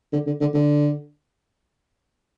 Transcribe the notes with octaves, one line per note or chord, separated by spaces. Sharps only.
D3
D3
D3
D3